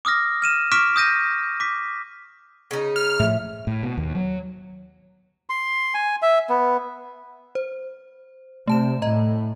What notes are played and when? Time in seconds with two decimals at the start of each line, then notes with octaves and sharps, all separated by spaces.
0.05 D6 D#6 F6 A#6
0.42 F6 D#7 E7
0.72 C#6 D6 F6 B6 D7 E7
0.96 D#6 G6 A#6 D#7
1.60 D6 B6
2.71 C#3 D#4
2.96 F6
3.19 A2 F3 E5
3.67 A2
3.83 B2
3.97 D#2
4.15 F#3
5.50 C6
5.94 G#5
6.22 E5
6.49 B3
7.55 C5
8.68 C3 A3 A5 E7
9.02 A2 D#5 A#5